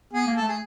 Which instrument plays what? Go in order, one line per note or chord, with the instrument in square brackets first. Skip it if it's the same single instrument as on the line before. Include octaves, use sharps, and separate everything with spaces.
[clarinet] B3 [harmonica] G#4
[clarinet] A#3
[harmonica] A4
[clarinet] A3
[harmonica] G#4